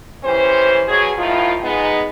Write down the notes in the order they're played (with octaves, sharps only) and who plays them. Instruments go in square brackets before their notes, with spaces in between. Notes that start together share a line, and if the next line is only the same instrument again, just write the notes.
[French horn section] E3 C#4 G4 C5
B2 F#3 G#4
A2 D#3 F3 E4 F4
G#3 B3 D#4